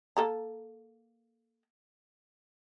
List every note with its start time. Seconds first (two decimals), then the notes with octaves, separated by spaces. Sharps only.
0.17 A#3 A4 A#5